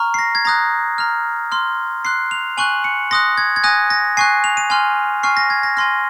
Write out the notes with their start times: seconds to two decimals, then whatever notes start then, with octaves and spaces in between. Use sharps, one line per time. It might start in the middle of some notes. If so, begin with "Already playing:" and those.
Already playing: A#5 C#6 F6
0.14 C7
0.19 A#6
0.35 G#6
0.45 A#5 D#6 F#6 A#6
0.98 A#5 F6
1.52 C6 F6
2.05 C6 F#6 C7
2.31 F7
2.57 G#5 C#6 F#6 F#7
2.84 C#7
3.11 C6 D#6 F#6 A#6
3.38 G#6
3.56 G#6
3.64 G#5 D#6 F#6 A#6
3.90 A#6
4.17 G#5 C#6 F#6 C7
4.44 F7
4.57 D#7
4.70 G#5 C6 F6
5.23 G#5 C#6 F6 C7
5.37 A#6
5.50 G#6
5.63 A#6
5.77 G#5 C6 F6 A#6